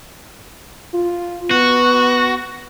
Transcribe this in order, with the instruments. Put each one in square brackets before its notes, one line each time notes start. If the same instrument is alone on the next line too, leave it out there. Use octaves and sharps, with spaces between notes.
[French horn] F4
[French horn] B3 [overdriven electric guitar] F#4